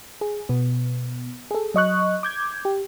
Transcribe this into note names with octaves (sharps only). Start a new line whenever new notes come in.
G#4
B2 B3
G#4 A4
F#3 D#5 C#6 F#6
D6 G6 G#6
G4